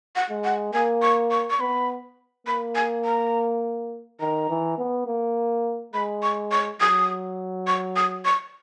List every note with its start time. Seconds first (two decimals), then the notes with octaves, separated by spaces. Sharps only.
0.16 F#5
0.30 G#3
0.44 F#5
0.73 A#3 G#5
1.02 C#6
1.31 C#6
1.50 C#6
1.60 B3 B5
2.47 A#3 B5
2.76 G#5
3.04 A#5
4.20 D#3 A#5
4.49 E3
4.78 B3
5.07 A#3
5.94 G#3 B5
6.23 C#6
6.52 C#6
6.80 F#3 D#6
7.67 C#6
7.96 D#6
8.25 C#6